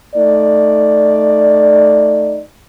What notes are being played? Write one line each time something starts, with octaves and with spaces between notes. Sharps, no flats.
A3 D#4 D5